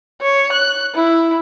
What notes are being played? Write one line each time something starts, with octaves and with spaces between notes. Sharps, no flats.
C#5
F#6
E4